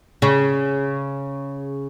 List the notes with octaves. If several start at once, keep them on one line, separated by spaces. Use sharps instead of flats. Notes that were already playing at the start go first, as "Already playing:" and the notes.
C#3